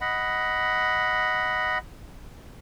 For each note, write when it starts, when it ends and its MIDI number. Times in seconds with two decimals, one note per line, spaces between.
0.01 1.78 75
0.01 1.78 78
0.01 1.78 83